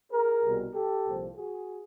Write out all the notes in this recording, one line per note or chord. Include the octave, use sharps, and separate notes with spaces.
G#4 A#4
C2 B2 G3
G4 A4
C2 A#2 F3
F#4 G#4